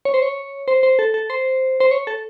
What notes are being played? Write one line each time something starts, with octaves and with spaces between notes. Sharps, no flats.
C#5
C5
C#5
C5
C5
A4
A4
C5
C5
C#5
A4